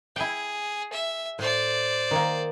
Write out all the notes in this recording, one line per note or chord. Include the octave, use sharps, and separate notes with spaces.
E4 G#4 G5
E5
A2 C5 D5
D#3 A#3